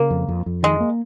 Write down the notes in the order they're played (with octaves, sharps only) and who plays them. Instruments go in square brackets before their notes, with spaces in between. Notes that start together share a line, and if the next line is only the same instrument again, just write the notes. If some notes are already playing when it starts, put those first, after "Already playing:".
Already playing: [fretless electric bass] C#3 [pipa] A#3
[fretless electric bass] F2
F2
F2
[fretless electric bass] D#3 [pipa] G#3
[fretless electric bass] A#3